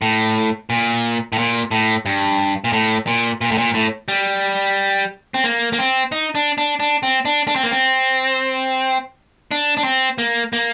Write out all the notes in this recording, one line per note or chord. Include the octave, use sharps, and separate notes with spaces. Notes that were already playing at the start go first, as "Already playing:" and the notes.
A2
A#2
A2
A#2
A2
G2
A#2
A2
A#2
A#2
A2
A#2
A2
G3
C4
A#3
A#3
C4
D#4
D4
D4
D4
C4
D4
D4
C4
A#3
C4
D4
D4
C4
A#3
A#3